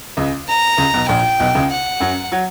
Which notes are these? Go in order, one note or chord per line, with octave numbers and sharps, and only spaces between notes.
C#2 C#3
A#5
C#2 C#3
B1 B2
A#1 A#2 G5
B1 B2
C#2 C#3
F#5
F#2 F#3
F#3